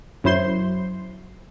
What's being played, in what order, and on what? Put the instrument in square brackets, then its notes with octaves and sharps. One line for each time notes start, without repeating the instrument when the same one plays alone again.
[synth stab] F#2 F#3 E4 C5 C6